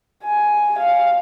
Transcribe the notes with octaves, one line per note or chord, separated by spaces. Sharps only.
G#5
F5